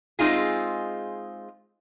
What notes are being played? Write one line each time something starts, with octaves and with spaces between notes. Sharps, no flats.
G#3 C4 D#4 F4 G#4